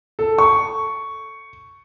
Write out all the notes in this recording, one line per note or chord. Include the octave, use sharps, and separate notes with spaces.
A4
C#6